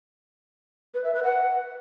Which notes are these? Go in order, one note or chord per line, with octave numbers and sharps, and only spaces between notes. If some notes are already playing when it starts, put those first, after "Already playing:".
B4
E5
B4
F#5